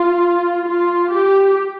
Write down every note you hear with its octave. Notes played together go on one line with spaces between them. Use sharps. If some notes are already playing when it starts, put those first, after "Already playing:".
Already playing: F4
F4
G4